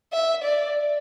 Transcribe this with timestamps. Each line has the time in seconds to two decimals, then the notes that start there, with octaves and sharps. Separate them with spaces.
0.13 E5
0.44 D5